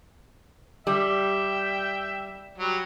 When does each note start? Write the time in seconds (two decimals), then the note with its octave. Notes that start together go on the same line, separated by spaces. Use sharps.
0.87 G3 E5 G5
2.58 F#3 G3